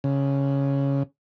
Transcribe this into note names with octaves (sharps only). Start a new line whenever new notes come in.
C#3